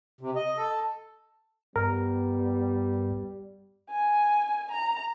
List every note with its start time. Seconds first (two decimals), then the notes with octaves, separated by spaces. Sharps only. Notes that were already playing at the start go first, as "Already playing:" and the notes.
0.21 C3
0.36 D#5
0.58 A4
1.76 G2 G3 B3 A#4
3.91 G#5
4.72 A#5